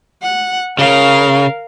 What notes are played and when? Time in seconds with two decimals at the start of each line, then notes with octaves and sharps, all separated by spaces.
0.23 F#5
0.79 C#3 A#4 F5